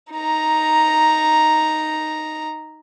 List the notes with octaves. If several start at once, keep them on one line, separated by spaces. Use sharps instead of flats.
D#4 A#5